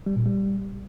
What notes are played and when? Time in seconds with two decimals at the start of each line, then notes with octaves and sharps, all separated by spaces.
0.06 G3
0.16 A#2
0.26 G3